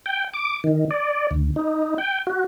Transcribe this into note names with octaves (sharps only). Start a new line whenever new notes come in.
G5
D6
D#3
D5
D2
D#4
G5
F#4